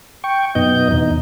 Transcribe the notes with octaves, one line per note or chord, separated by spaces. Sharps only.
G5 C#6
F#2 B2 B3 D#4 D#5 G6
E2 B2 D#4